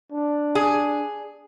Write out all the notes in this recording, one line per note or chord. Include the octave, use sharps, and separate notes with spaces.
D4
G#4